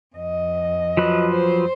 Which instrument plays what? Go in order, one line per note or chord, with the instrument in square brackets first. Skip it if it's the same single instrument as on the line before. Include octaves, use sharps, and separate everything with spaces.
[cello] F2 D#5
[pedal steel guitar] F3 F#3 B4
[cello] C5